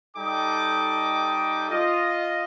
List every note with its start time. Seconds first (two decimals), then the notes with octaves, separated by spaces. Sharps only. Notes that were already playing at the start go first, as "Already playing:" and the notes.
0.16 G3 D#4 A4 D#5 G5 D6
1.70 F4 D#5